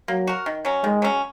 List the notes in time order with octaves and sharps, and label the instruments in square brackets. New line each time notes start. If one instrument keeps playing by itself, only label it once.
[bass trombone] F#3 [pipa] A#3
[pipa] F#4 A#4
D#3
F#3 C#4
[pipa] D#3 [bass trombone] G#3
[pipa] F#3 C#4